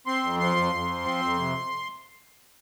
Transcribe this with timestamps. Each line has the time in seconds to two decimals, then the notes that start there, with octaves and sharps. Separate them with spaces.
0.06 C4 C6
0.23 F2
0.40 F3 C6
0.57 F2
0.73 F2
0.89 F3
1.05 C4
1.23 F2
1.39 C3